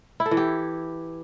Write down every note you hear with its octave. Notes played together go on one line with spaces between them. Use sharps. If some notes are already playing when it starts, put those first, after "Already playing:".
E4
A4
E3
G4